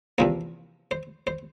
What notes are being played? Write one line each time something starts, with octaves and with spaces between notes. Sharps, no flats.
E2 C3 F3 A#3 C5
C5
C5